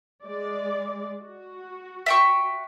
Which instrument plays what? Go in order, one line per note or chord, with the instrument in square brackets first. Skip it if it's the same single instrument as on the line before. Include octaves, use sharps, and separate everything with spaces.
[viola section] G#3 D5
F#4
[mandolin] E5 G5 C#6